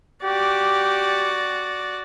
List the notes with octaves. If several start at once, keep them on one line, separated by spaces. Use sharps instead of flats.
F#4 G4 D5